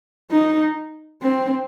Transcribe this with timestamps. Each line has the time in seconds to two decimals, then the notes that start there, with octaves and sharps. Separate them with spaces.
0.31 D#4
1.22 C4